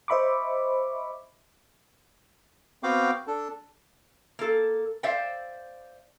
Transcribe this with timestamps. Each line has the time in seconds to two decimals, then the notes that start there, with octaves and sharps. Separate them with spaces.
0.08 C5 D#5 E5 B5 C#6 D6
2.83 B3 C4 F#4 F5 G5 D6
3.27 D4 A4
4.39 A#3 A4
5.03 C5 D5 E5 F5 G5